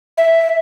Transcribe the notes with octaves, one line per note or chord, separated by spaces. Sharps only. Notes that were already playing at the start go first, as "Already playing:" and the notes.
E5